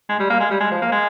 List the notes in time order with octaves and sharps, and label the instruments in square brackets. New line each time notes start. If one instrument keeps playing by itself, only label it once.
[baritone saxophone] G#3
G3
A#3
G#3
G3
G#3
F3
A#3
G#3